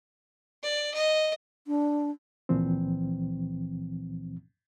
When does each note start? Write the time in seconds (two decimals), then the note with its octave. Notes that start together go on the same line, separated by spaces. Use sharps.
0.63 D5
0.94 D#5
1.67 D4
2.49 C#2 A#2 E3 F3 C4